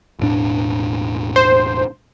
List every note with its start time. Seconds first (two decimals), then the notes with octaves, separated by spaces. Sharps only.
0.19 E1 A2 D4
1.36 C5